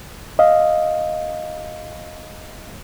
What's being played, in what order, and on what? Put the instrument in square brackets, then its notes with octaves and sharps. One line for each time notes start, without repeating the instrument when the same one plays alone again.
[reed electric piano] D#5 F5